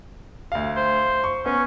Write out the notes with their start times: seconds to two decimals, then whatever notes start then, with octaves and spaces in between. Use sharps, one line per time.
0.52 D2 F5
0.77 C5
1.24 C#6
1.46 B3 C#4